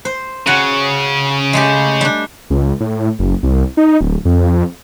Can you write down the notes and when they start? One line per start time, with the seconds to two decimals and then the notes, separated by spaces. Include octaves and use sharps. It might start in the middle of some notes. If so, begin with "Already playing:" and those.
0.05 C5
0.47 C#3 F#4 C#5
1.53 G#3 A3 G4
2.01 G3 D4
2.50 C#2
2.80 A2
3.19 F#1
3.43 C2
3.77 D#4
4.01 D1
4.25 F2